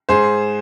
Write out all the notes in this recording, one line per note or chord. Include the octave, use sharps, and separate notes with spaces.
G#2 G#4 C5